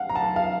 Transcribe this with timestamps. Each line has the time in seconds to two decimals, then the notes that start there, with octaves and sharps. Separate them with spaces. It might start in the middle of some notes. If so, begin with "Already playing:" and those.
Already playing: F5 F#5
0.09 A#5
0.16 A5
0.36 F5